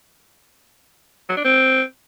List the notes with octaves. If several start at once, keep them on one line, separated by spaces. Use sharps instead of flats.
F#3
D4
C4